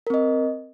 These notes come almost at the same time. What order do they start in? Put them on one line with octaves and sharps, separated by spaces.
A#4 C4 D#5